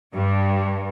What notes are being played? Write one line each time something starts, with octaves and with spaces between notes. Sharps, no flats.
G2